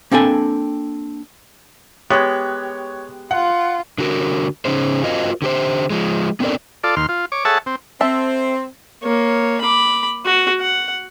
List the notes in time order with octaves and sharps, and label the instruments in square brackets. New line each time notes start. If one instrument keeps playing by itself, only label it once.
[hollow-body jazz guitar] A#3 C4 D4 A4 G#5
[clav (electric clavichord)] G#3 B3 [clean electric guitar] G4 [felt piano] C#5 F#6
[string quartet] F4 [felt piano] F#5
[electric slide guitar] D3 F#4 A#4
C#3 C#4 D#4 G#4 C5
F4 F#4 A#4 C5 D#5 F5
D3 G4 C5
F3 G#3
B3 C4 D4 A4 A#4 D5
[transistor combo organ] F4 A4 D5
D#2 C6 F6
F4
C#5 D6
G#4 A4 C#5 E5 F#5 A5
C4
[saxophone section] C4 [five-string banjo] A4 E5
[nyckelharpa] A#3 C#5
B5 D6
F#4
F#5